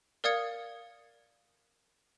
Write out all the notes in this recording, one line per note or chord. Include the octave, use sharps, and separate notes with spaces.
A#4 D5 F5 D#6 G#6 C#7